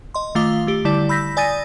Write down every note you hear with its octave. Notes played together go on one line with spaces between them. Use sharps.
D#5 C6
D#3 A3 F4 F5 D6 G7
A3 G4
D3 G3 E4 D5
B5 E6 G6 A#6 B6
D5 G#5 D#6 A6 A#6 D#7